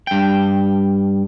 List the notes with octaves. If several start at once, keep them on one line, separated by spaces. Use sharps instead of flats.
G2 G5